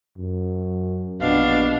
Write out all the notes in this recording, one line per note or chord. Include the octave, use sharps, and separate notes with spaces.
F#2
A#1 B2 D4 F5